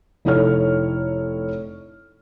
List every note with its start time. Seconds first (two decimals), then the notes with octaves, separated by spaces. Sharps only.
0.25 F1 D#4 E4 A4 C#5 F6